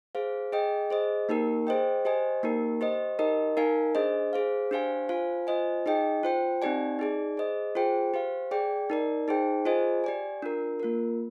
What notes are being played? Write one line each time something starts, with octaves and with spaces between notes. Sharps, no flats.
G#4 C5 F5
G#4 D#5 G5
G#4 C5 D#5
A#3 D#4 G4 A#4
G#4 C5 D#5 G5
G4 C5 D#5 G#5
A#3 D#4 G4 A#4
G4 C5 D#5
D#4 G4 A#4 D#5
D#4 A#4 F5 G#5
D4 G#4 C5 D#5
G#4 C5 F5
D4 G4 C5 F5 G#5
F4 C5 F5 G#5
F4 C5 D#5 G#5
D#4 G#4 D#5 G5
F4 C5 G5
C4 D#4 G4 D5 G#5
D#4 G#4 D5
G#4 C5 D#5
F4 G#4 C5 G5
G4 C5 F5
G#4 D5 G5
D#4 A#4 D5
D#4 G#4 C5 G5
F4 G#4 C5 D#5 G#5
G4 D5 G#5
D4 F4 A#4
A#3 F4 A#4